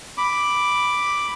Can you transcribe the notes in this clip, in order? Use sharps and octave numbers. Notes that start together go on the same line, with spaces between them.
B5 D6